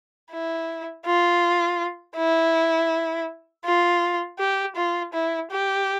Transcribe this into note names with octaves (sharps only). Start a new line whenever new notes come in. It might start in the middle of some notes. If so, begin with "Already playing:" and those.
E4
F4
E4
F4
G4
F4
E4
G4